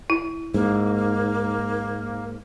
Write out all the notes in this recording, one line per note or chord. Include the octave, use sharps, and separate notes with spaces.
E4
G#2 A#3